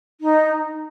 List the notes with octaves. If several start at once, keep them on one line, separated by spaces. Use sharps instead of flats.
D#4